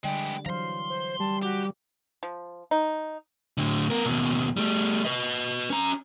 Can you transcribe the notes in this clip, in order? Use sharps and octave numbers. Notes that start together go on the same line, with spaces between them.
D3 G3 G#3 B3 D5 G5
E3 F#3 C5 F5 A#5 C6
C5
G3 A5
F#4 G4
F3
D#4
A2 D3
B3 A#4
D#2 B2
G3 A3
B4 D#5
C#4 A#5